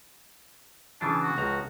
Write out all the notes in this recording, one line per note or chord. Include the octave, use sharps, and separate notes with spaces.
C#3 E3 D4 A5
F#4
C#2 F3 A#5